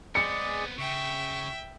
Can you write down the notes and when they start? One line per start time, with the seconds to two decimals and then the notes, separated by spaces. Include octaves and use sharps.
0.15 G#3 B3 C4 G#4 D5 C#7
0.78 C#3 E5 G5 C#6